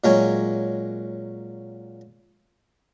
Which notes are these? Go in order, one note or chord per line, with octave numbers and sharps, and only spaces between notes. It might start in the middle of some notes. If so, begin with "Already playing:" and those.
A#2 F#3 G#3 C#4 G5 G#5